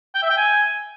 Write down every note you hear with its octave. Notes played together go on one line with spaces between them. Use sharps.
G5
E5
G5
G#5